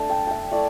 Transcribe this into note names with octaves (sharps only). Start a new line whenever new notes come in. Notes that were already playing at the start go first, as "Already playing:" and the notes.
Already playing: A3 D4 A5
G5
E5 G5
A3 E4 D5